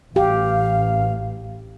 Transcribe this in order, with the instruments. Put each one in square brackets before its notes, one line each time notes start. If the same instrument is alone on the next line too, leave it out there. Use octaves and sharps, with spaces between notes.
[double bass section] A1 [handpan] G4 [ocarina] F5